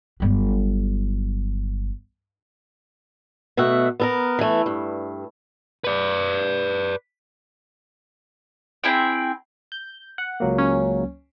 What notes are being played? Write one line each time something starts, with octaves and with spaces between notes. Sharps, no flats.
G1 F#3
B2 A3 E5 F#5
B3 A4 A#4
E3 A3
G2
B4 D5
C4 E4 G#4 G5
G6
F#5
C#2 F#3 A#3
C#4